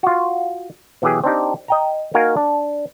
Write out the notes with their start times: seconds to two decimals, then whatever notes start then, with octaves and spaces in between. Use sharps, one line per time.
0.03 F4 F#4
1.02 B2 E3 F#3 G4 G#4
1.24 C4 D4 D#4 G4
1.68 D#5 G5 A#5
2.14 A#3 D#4 F#4 A#4 F5 G#5
2.37 D4